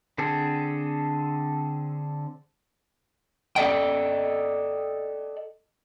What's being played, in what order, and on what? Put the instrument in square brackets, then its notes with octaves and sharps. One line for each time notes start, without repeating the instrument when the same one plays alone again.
[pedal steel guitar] D3 C4 G#4 A4
[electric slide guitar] A4 D5 D#5 G5